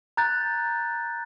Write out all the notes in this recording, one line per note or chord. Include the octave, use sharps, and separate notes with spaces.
A#5 F#6 G6 A6